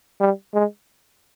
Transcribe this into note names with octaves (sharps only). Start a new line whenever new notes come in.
G3
G#3